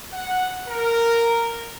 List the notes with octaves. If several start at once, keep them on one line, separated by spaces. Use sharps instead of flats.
F#5
A#4